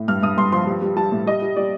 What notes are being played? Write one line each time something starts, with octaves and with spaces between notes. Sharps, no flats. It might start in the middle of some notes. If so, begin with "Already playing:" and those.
Already playing: A2
G2 F6
G2 D#6
G2 C6
F3 C6
G3
G3
G3 A5
A2
G3 D#5
G3
G3 D5